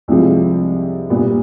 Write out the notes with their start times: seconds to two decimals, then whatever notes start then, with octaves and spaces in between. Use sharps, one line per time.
0.08 C2 C3 F3 G#3
1.10 A#2 G3 B3